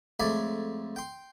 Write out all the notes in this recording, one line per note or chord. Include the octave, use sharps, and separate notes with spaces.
F2 G#3 A3 C#5 D5 B5
G5 C6